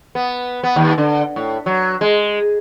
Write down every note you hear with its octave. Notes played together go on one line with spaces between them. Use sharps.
B3
B3
D#2
D3
A2
F#3
G#3